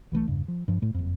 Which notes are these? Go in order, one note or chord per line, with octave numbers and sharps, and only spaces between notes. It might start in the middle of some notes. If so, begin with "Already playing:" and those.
B1 E3 F3 A3
E2 G2 C#3
F3
G2 F3
A2 A3
F#1 F2